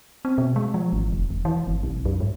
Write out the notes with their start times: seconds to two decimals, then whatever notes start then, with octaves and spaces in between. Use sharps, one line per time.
0.25 C4
0.38 B2
0.56 G#3
0.74 F3
0.93 G#1
1.12 E1
1.30 E1
1.45 E3
1.67 G1
1.83 B1
2.05 F#2
2.20 G#2